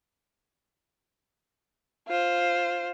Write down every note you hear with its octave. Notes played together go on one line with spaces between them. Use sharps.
F4 C5